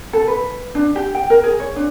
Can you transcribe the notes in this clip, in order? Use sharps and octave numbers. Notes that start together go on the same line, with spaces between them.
A4
B4
D4
G4
G5
A#4
G#4
C#5
D4